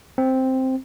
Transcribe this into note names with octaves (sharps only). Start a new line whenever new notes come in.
C4